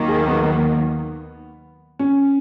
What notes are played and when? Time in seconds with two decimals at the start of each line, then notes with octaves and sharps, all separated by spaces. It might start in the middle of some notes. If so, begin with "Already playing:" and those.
Already playing: D#2 D#3 F#3 A#3
0.08 G#4
0.27 B3
1.99 C#4